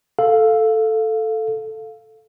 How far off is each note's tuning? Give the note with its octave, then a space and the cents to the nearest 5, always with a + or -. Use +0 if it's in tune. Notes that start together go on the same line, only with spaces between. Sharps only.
A4 +0 F5 +0